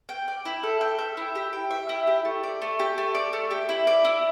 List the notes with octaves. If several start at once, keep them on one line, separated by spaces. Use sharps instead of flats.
G5
D5
E4
A4
G5
E5
E4
G4
G5
E5
E4
G4
A3
D5
A3
G4
A3
D5
A3
G4
E4
D5
E4